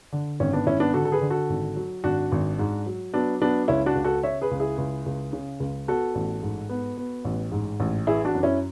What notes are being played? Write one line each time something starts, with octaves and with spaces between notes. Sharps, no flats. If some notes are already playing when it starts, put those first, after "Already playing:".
D3
G#1 C#4
B3 D4
G#1 C#4 E4
B3 D4
D3 F#4 A4
A4
G#4 B4
D3
F#4 A4
G#1
F#3
G#1 D4 F#4
G#1
G#2
F#3
F#3 B3 D4
F#3 B3 D4
C#2 C#4 E4
D4 F#4
C#2
F#4 A4
C#3 C#5 E5
G#4 B4
C#2
E4 G#4
C#2
C#2
C#3
C#2
B3 F#4 A4
A1
G#2
B3
B3
A1
G#2
A1
E3 E4 G#4
D4 F#4
F#2
C#4 E4